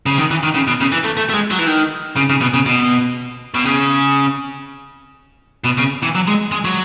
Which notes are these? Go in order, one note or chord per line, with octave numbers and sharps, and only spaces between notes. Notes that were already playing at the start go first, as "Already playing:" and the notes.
C#3
D#3
E3
D#3
C#3
B2
C#3
E3
A3
A3
A3
G#3
F#3
E3
D#3
C#3
C#3
B2
C#3
B2
B2
C#3
B2
C#3
E3
F#3
G#3
G#3
F#3